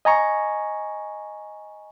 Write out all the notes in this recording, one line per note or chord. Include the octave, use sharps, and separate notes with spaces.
D#5 G#5 A#5 C#6